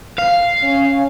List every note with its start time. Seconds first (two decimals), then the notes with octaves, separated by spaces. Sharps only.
0.19 F5
0.63 C#4